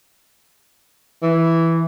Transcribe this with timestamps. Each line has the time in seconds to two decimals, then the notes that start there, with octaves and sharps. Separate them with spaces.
1.23 E3